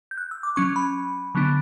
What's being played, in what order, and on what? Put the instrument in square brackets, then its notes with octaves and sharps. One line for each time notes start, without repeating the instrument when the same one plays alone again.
[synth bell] G6
F#6
E6
D6
F#3 C#4 C#6
B5
D3 F#3 B3 D4